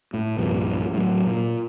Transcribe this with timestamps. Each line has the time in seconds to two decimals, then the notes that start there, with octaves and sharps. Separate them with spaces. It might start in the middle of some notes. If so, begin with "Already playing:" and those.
0.14 A2
0.38 C2 G2 A#2 F3
0.94 A2 F#3
1.27 A#2